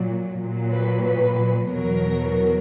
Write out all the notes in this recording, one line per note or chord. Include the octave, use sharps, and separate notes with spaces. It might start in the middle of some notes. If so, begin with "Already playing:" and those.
Already playing: A#2 F#3
A#2 F#3
B4
B4
E2 B2 F#3 A#4